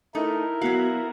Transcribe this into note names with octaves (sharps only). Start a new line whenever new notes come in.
A3 D#4 E4 A#4
F#3 B3 F#4 F5